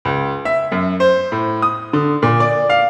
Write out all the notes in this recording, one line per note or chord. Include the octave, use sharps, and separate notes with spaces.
C#2
E5
F#2
C5
A2
D#6
D3
A#2
D5
F5